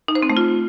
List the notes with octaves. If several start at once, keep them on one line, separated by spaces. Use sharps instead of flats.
D#4
C5
C4
A3
F4